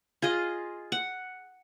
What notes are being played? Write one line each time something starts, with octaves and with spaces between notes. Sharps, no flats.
F4 G#4 D#5
F#5